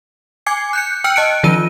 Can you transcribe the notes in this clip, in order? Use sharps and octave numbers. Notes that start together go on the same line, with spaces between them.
G#5 D6 G#6 C7 C#7
F#6 G6 C#7
G5 E6 F6 C#7
D#5 A5 F#6 C#7 D7
D#3 F3 F4 D#7